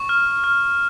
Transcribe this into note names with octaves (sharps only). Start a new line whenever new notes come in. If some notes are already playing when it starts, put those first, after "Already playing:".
Already playing: C#6
F6
F6